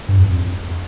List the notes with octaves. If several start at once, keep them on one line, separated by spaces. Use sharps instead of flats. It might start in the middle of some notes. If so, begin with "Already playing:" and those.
G2
F2
F2